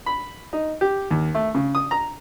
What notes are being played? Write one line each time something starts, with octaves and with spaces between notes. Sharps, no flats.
B5
D#4
G4
D#2
A3
C#3
D#6
A#5